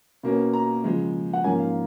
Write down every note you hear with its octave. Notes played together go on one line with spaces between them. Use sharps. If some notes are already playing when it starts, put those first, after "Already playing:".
B2 A#3 C#4
A#5
C#3 F3 G#3
F#5
G#2 F3 A#3 C#4 G#5
F5